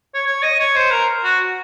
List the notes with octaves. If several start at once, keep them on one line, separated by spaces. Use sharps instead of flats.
C#5
C#5
D#5
C#5
C5
A#4
F#4